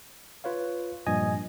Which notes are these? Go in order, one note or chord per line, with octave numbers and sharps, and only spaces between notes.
F4 B4 C#5 F5
G2 A#2 F3 D#5 G#5